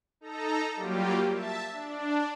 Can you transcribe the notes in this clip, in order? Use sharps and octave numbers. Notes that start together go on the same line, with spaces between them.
D#4 A4 A#5
F#3 G3 A#3 F4 G4
E5 A5
D4